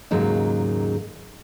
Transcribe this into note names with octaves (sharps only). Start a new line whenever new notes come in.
D#2 G#2 C#3 F#3 A#3 D#4